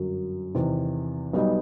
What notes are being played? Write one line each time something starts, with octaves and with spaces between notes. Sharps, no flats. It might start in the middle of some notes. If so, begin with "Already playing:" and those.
Already playing: G1 F#2 F#3
E2 C3 D#3
B1 B2 G3 B3 D#4